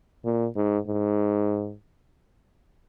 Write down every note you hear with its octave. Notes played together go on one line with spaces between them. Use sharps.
A#2
G#2
G#2